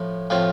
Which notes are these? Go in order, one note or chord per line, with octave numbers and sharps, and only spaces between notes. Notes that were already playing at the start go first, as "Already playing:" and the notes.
Already playing: A2 F3
A2 F3 C4 F4